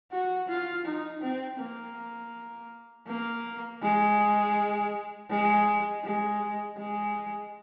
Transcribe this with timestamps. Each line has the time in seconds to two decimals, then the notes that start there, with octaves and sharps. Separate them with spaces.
0.11 F#4
0.48 F4
0.85 D#4
1.22 C4
1.60 A#3
3.07 A#3
3.82 G#3
5.30 G#3
6.04 G#3
6.77 G#3